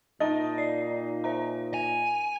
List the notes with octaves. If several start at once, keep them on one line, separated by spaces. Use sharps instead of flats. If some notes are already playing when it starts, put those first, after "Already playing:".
A#2 D#4 E5 A5 A6
D5 C7
C5 E5 A#5
G#5 F7